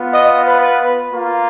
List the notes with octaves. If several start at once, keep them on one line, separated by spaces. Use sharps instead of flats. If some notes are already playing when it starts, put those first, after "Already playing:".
Already playing: B3 F4
D#5
B4
A#3 F4